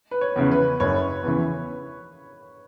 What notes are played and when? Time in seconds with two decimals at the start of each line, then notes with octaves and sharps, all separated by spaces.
0.11 B4
0.21 C#5
0.36 E2 C#3 E3
0.52 B4
0.80 F#1 C#5
1.23 E2 C#3 E3